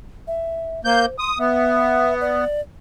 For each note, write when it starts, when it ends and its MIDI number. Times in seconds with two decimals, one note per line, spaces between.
0.27 0.81 76
0.85 1.06 58
0.85 1.17 72
0.85 1.06 91
1.19 1.31 84
1.19 1.38 87
1.39 2.44 59
1.39 2.14 76
2.21 2.61 74